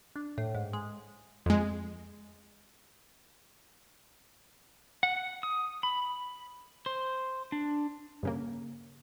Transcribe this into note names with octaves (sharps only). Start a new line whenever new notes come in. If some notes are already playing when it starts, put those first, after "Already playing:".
D4
A2
G#2
G#3
F2 G#3
F#5
D#6
B5
C5
D4
G2 C#3 A#3